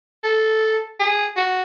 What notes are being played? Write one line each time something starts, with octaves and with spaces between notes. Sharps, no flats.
A4
G#4
F#4